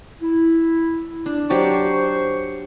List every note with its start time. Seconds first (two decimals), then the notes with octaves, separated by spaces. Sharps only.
0.22 E4
1.26 D4
1.50 F#3 G4 C5 D5 C#6